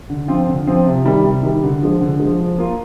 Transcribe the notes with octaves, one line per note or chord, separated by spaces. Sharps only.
D3
F3 C4 F4
D3
F3 C4 F4
C3
D#3 G3
C3
D#3 G3
D3
F3 G#3
D3
F3 G#3
F3
A#3 F4